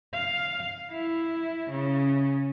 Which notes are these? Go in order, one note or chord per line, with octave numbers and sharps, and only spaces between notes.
F5
E4
C#3